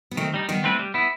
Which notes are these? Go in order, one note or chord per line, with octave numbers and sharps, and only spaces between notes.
B3
D#3 A3 C4
G3 D#4
D#3 G3 B3
A3 C4 E4 B4
G3
B3 E4